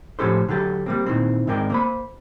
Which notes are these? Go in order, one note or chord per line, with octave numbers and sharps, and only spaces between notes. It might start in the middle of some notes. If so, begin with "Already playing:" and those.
A2 F3 C#4 G4 A4 C5
D3 F#3 G4 A4
G3 A#3 C4
A#2 D#3 E3 C4
G#2 D#3 C4 A#4 D5 G5
A#3 C5 B5